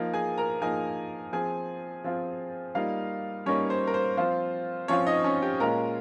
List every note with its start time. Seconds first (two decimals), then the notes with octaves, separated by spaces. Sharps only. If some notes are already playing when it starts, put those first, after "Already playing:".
Already playing: F3 A#3 D#4
0.14 G#4 G#5
0.38 A#4 A#5
0.61 F3 A#3 D#4 G#4 G#5
1.33 F3 C4 F4 G#4 G#5
2.04 F3 C4 F4
2.75 G3 A#3 D#4 F4 F5
3.46 G3 A#3 C#4 D#4 C#5
3.70 C5
3.87 A#4
3.94 C5
4.17 F3 C4 F4 C5
4.88 F3 C4 C#4 F4 C#5
5.06 D#4 D#5
5.24 C#4 C#5
5.42 G4 G5
5.60 A#2 G#3 C#4 F4 A#4 A#5